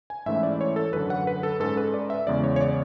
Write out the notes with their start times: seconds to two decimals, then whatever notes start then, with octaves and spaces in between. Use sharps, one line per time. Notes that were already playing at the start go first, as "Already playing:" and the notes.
0.10 G#5
0.26 G#2 E3 A3 C#4 E4 E5
0.43 D5
0.61 C#5
0.76 A4
0.93 F#2 D3 F#3 B4
1.10 F#5
1.27 B4
1.43 A4
1.60 G#2 G#3 C#4 A4
1.77 B4
1.94 D5
2.10 E5
2.27 E2 C#3 G#3 B3 D5
2.44 C#5
2.56 C#5
2.61 D5